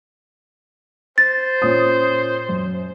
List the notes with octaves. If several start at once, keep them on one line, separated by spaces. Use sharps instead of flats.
C5 A6
A#2 C#4 D#6
F#2